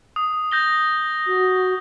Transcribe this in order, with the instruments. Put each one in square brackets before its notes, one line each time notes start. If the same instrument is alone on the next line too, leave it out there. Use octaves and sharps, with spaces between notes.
[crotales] D#6
G6 A#6 G7
[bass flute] F#4